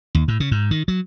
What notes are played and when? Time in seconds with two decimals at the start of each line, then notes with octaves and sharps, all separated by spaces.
0.15 D#2
0.28 A2
0.40 C#3
0.51 G#2
0.71 D#3
0.88 F#3